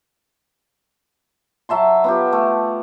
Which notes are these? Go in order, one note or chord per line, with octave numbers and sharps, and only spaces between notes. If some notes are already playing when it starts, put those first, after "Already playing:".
F#3 E5 A5 C6
B3 F4 G4
A3